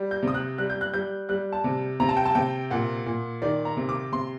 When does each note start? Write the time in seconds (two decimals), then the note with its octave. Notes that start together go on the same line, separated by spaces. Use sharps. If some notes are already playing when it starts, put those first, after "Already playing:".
Already playing: G3
0.11 G6
0.23 C3 D#6
0.34 F#6
0.58 G3 F#6
0.70 G6
0.81 F#6
0.94 G3 G6
1.29 G3 F#6
1.53 A5
1.64 C3
2.00 C3 A#5
2.09 A5
2.17 G5
2.26 A5
2.35 C3 G5
2.70 A#2 F#5
3.06 A#2
3.42 D#3 D5
3.65 A#5
3.77 C3
3.89 D6
4.12 C3 C6